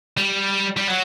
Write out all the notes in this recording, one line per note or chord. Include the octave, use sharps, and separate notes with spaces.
G3
G3
F#3